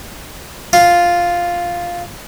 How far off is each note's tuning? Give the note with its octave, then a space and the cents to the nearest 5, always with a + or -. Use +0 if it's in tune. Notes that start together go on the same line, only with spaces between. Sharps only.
F4 +0